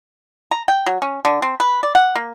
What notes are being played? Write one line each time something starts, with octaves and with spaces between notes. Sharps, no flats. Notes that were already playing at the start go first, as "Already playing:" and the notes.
A#5
G5
F#3
C#4
D3
C4
B4
D5
F#5
A#3